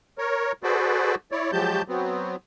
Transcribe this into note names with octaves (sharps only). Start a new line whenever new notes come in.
A#4 C#5
F#4 G#4 A4 B4 C5 D5
E4 C#5 D5
F3 F#3 G#3 G4 A5 G6
F#3 B3 C4